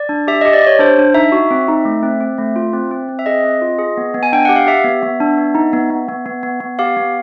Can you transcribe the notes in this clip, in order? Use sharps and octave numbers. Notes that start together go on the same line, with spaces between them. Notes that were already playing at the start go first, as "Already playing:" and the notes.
Already playing: D5
D4
G4 E5
G4 D#5
D5
G4 C#5
D4 C5
D4
D#4 E5
F#4
C4
D#4
A3
C4
C4
A3
F4
C4
C4
C4
E5
G#4 D#5
C4
F4
G#4
B3
B3
G#5
D4 G5
G4 F#5
F5
G4 E5
B3
B3
D4
B3
D#4
B3
B3
B3
B3
B3
B3
G4 F5
B3